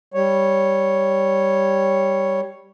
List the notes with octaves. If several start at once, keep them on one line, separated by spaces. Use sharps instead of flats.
G3 C#5